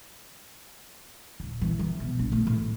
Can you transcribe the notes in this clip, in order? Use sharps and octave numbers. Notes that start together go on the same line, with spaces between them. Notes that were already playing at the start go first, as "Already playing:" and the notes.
D#1
E3
E3
B2
A#1
A3
A1